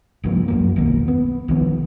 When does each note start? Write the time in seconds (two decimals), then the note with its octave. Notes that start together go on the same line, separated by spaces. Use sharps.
0.24 C2 G2 F3 A#3
0.48 F#2 F#3 A#3
0.76 E1 B1 D#3 A#3
1.08 B3
1.48 C2 D#3 F3 B3